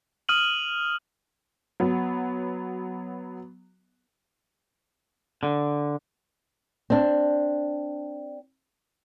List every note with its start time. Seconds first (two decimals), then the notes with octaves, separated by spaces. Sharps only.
0.29 D#6 F6 D#7 F#7
1.80 F#3 B3
5.43 D3
6.90 C4 D4